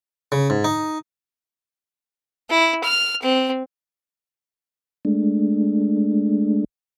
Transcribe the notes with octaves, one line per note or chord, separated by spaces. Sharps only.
C#3
G#2
D#4
E4
F6
C4
G#3 A3 D4